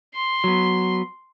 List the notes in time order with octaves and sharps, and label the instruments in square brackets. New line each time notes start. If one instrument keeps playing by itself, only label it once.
[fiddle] C6
[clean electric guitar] F#3 B3